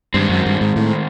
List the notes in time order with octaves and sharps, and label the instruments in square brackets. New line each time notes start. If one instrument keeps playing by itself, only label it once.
[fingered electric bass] G2 [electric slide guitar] D#3 G#3 C4
[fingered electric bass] F#2
G2
G#2
A2